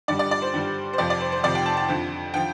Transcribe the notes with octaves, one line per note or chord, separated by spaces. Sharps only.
G2 D3 G3 D5
D5
D5
C5
G2 D3 G3
C5
F2 C3 F3 D5
D5
C5
C5
F2 C3 F3 D5
G5
A5
A5
F2 D3 F3
D3 F3 G5